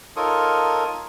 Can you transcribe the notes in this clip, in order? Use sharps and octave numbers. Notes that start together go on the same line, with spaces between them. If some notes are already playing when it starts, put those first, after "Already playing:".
D#4 F4 A4 A#4 C#5 D#6